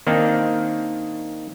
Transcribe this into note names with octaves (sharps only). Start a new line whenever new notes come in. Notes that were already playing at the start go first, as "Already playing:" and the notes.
D#3 A#3 C4 D4 D#4